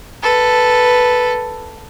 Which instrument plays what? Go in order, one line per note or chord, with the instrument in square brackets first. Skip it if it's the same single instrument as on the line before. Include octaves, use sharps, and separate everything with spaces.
[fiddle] A4 B4